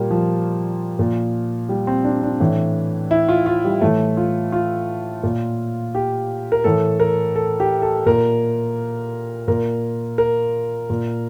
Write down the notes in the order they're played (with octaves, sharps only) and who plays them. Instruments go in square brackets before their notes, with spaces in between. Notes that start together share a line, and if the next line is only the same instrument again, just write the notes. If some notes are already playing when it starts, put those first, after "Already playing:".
Already playing: [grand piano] A#2 G3 A#3
F3
A#2
G3
C4
D4
D4
A2 E3
E4
F4
F4
G3
A2 E3 A3
F4
F4
A#2
G4
A#4
A2 E3 A4
A#4
A4
G4
A4
A#2 A#4
A#2 A#4
A#4
A#2